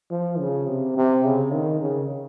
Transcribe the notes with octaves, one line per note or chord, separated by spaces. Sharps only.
F3
C#3
C3
C3
C#3
D#3
C#3